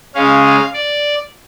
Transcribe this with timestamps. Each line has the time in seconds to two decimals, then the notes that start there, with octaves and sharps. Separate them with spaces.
0.15 C#3 G#3 C#4 F5
0.44 F5
0.74 D5